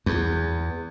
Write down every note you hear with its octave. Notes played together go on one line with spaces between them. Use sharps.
E2